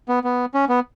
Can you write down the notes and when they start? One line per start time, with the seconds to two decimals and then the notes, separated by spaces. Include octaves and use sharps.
0.09 B3
0.24 B3
0.54 C#4
0.69 B3